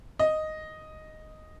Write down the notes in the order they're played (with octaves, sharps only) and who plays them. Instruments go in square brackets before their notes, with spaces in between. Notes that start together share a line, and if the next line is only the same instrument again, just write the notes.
[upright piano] D#5